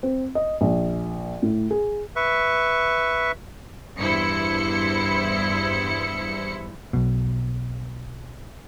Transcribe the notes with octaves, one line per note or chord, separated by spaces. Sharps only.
C4
D#5
A#1
A2
G#4
B4 E5 C#6
E2 G2 E4 C5 C#7
B1 B2